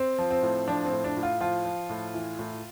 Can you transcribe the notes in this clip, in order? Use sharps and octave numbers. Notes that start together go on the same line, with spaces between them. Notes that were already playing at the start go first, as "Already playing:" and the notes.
Already playing: C4
F3
C4
A2
F3 D4
C4
A2
D4
A2
F4
F3 F4
F3
A2
E3
A2